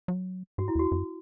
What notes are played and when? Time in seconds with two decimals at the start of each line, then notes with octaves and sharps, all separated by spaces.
0.08 F#3
0.58 G#2 F#4
0.68 E4
0.75 E2 F#4
0.92 F#2